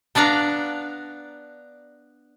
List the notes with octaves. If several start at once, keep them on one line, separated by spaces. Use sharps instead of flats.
B3 D4 D5 F5 A#5